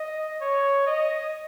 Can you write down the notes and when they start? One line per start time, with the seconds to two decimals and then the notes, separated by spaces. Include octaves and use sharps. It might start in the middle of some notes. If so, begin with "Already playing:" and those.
Already playing: D#5
0.41 C#5
0.86 D#5